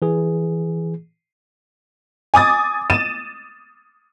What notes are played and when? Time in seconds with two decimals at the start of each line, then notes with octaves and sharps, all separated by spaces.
0.02 E3 G#4
2.34 G#5 D6 D#6 A6
2.90 A6 D#7 E7